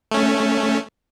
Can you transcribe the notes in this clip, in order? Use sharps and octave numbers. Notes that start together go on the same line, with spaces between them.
A3 C#4